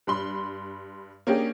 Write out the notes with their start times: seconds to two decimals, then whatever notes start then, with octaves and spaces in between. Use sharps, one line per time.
0.07 G2 B5 C6
1.27 A#3 C#4 D4 G4 G#4